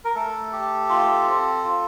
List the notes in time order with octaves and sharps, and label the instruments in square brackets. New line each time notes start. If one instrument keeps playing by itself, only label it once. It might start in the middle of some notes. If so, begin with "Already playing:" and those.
[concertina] A#4
A3 A4
G4
F4
C4
F4